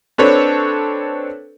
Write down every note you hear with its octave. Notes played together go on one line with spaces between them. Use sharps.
C4 D4 A4 B4 C#5